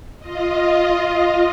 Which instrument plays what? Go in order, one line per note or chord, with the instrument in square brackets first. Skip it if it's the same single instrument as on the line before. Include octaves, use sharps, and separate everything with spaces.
[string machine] F4 D#5